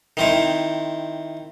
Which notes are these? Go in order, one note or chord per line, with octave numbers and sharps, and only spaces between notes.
D#3 C4 E4